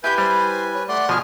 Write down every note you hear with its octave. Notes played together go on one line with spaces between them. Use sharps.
E4 G4 B4 G#5 B5 G6
G3 C5
C#5
A3 D5 F#5 C6
B2 F3 G#4 G#5 F6